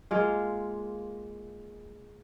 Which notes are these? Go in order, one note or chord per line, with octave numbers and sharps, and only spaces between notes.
G#3 A#3 F4